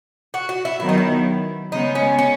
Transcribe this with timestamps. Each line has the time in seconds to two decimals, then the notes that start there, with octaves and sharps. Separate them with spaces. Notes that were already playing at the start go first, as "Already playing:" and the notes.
0.34 F#4
0.49 F#4
0.65 E4
0.80 D#3 F#3 B3 E4
0.89 D#4
0.98 E4
1.72 C#3 G#3 B3 D#4
1.95 C#4
2.18 C#4